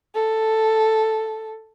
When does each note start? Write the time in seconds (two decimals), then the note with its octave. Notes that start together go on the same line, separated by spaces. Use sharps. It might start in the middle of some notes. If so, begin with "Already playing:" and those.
0.15 A4